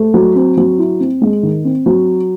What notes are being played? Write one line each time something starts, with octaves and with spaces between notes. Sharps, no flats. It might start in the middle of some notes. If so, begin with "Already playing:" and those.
Already playing: A3
F#3
C4
F#3
E4
C4
G#3
D#3
C4
F#3